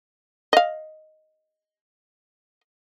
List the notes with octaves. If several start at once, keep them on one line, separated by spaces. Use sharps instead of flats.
D#5 F5